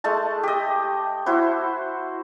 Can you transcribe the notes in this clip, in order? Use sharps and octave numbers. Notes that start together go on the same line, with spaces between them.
G#3 A3 A5
G4 D#5
E4 F#4 C5